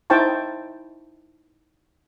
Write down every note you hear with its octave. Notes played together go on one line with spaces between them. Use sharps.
D#4 E4 C5 G5 A5 C#6